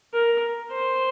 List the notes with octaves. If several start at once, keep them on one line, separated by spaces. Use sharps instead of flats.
A#4
C5